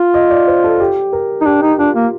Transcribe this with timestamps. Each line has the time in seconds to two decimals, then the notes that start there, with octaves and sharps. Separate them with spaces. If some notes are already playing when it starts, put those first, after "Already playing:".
Already playing: F4
0.14 D#5
0.30 D5
0.47 C5
0.64 A4
0.75 A4
0.80 G4
1.13 A#4
1.41 D#4
1.46 D4 G4
1.62 D#4
1.78 D4 F4
1.96 A#3